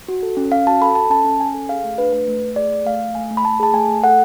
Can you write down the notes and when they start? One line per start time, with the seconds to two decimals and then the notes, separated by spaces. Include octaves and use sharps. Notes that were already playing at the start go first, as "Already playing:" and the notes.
0.08 F#4
0.23 A4
0.37 C#4
0.51 C#4 F5
0.67 F#4 A5
0.82 A4 B5
0.95 A4 A5
1.10 C#4 A5
1.25 C#4
1.39 C#4 G#5
1.54 A4
1.69 G#4 F5
1.84 A3
1.98 D4 B4
2.12 A3 B4
2.28 A3
2.42 A3
2.56 G#4 D5
2.71 A3
2.85 A3 F5
3.01 A3
3.15 A3 G#5
3.31 A3
3.37 B5
3.44 A3 A5
3.60 G#4 A5
3.73 A3 G#5
3.88 A3
4.04 A4 F#5